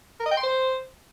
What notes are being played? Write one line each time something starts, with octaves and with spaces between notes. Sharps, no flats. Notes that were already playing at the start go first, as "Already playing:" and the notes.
A#4
D#5
G5
C6
C5